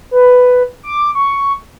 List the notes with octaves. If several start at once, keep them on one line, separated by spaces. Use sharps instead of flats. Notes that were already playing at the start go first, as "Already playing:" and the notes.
B4
D6
C#6